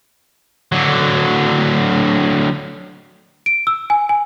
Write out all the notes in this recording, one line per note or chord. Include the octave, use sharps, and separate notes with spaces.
D3 F#3
D7
E6
G#5
G#5